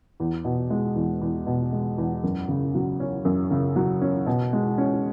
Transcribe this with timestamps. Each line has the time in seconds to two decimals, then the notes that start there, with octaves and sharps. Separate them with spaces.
0.20 E2
0.44 B2
0.70 G#3
0.96 E2
1.21 E2
1.47 B2
1.73 G#3
1.98 E2
2.23 F#2
2.48 C#3
2.75 F#3
3.00 C#4
3.25 F#2
3.51 C#3
3.76 F#3
4.02 C#4
4.26 B2
4.53 G#3
4.78 C#4